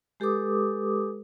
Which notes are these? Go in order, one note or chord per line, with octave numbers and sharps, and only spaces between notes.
G#3 G4 A4 B4 D6 D#6